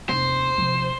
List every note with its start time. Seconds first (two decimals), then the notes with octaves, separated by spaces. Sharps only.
0.09 F1 D#2 C5
0.58 C3 F3